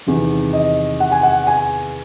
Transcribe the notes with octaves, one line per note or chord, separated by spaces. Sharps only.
E2 C3 D#3
D#5
F#5
G#5
F#5
G#5